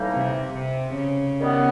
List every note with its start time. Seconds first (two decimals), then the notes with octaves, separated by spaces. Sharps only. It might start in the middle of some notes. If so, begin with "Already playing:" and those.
Already playing: A2 E3 G3 A#3 D#4
0.12 C3
0.54 C3
0.96 C#3
1.39 D#3 G3 B3